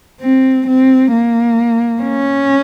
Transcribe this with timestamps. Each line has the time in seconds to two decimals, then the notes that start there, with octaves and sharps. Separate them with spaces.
0.20 C4
0.67 C4
1.12 A#3
2.02 C#4